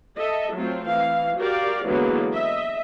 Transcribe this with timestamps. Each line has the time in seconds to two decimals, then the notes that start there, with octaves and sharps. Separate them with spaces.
0.18 A4 D#5 E5
0.54 F#3 A3 C4 F4
0.87 E3 F5
1.36 F#4 G4 A#4 D5 F5
1.86 D3 E3 F#3 G#3 A#3 B3
2.34 D#5 E5